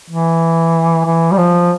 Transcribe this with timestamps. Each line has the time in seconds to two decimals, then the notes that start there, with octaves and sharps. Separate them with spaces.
0.10 E3
1.05 E3
1.32 G3
1.37 F3